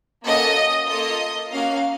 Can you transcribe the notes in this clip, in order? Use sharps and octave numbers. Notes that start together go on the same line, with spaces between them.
A#3 C#4 F#4 A4 D#5
A#3 F4 A4 D#5
A#3 C#4 F#4 F5